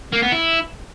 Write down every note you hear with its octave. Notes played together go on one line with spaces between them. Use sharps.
A#3
B3
E4